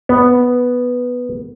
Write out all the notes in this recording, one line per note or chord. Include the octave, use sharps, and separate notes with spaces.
B3